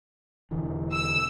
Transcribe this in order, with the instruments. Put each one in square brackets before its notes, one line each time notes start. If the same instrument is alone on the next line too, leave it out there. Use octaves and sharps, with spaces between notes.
[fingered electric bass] E1 D3 E3
[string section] E6